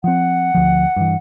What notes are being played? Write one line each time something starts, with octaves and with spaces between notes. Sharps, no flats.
F3 C4 F#5
D2 F3
G2 E3